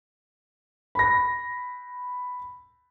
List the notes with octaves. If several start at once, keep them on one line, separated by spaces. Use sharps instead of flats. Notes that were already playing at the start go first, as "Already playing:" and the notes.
B5 A#6